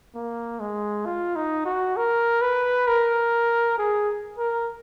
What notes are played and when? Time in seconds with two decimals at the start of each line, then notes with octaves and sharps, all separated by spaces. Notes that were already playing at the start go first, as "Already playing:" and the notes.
0.15 A#3
0.60 G#3
1.06 F4
1.36 D#4
1.65 F#4
1.97 A#4
2.42 B4
2.88 A#4
3.78 G#4
4.38 A#4